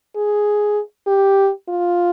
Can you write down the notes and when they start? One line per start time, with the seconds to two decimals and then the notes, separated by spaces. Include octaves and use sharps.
0.16 G#4
1.07 G4
1.69 F4